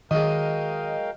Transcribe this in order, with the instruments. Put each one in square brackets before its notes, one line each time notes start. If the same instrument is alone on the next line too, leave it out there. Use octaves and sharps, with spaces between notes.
[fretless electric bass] D#3 [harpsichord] F#3 G#3 [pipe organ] A#4 F5 G5 [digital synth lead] D#5